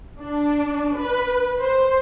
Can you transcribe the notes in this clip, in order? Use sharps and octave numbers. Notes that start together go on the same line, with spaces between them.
D4
B4
C5